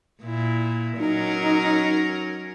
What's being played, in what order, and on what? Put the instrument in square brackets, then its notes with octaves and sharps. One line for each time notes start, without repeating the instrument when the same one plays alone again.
[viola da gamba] A#2 E4
[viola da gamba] F#3 C#4 A#4 [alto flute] D#4